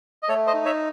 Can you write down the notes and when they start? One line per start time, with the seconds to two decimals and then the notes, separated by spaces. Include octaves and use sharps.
0.23 D#5
0.29 A3 A4 C#5
0.47 C5 D#5
0.54 D#4
0.65 C#5 E5